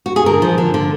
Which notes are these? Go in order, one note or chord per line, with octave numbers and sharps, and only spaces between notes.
F#4
G#4
D3 A#4
F3
D3
D3